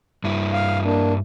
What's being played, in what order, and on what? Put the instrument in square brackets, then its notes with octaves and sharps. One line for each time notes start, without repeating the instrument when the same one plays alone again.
[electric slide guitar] G2 E4
[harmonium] F5
A#3 D4